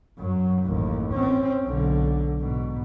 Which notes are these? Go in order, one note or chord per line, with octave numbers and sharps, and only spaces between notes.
F#2 F#3
A1 D#2
C4 C#4
B1 D3
G#2 B2